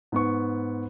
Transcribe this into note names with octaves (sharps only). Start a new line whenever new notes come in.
G#2 B3 C#6